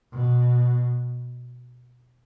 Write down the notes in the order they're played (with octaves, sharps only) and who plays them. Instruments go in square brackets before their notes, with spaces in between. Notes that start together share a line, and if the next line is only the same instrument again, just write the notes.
[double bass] B2